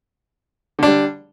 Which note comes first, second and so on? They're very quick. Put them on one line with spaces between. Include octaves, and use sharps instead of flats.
D3 D4 G3